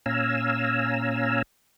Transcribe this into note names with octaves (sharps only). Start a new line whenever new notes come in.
A#2 C#4 F5 G#5 A#5 E6